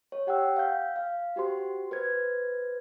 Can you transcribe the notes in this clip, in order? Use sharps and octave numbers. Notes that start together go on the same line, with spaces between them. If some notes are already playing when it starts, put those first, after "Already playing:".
C#5
G4 F#5 G5 E6
F5 G6
F5
F#4 G4 C5 C6
B4 C5 G#6